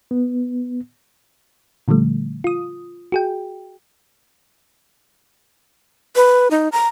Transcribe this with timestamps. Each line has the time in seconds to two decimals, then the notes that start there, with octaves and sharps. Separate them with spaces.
0.11 B3
1.88 A#2 D3 F3 G3 A3
2.44 F4 D#6
3.12 F#4 G#4 G5
6.16 B4
6.51 D#4
6.72 A#5